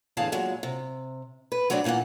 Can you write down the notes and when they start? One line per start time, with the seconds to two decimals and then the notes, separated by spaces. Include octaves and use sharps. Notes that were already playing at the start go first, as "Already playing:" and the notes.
0.17 E2 A2 D3 G#4 F5 A5
0.32 A#2 F#3 G#3
0.63 C3
1.52 B4
1.70 F#3 A3 C4 D4 D5
1.84 A#2 E3 A#3 B3 F#5